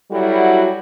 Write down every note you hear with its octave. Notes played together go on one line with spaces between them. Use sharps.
F#3 G3 E4 F#4 A4